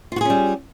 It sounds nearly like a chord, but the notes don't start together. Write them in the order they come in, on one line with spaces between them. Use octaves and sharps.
F4 F#4 G#4 C#4 G3